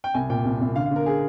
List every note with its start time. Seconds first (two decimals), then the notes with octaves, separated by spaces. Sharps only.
0.04 G5
0.14 C2 G#5
0.30 A#2 G5
0.45 C2
0.61 C2
0.76 D3 F5
0.86 F5
0.91 D3 A#4
1.06 G#4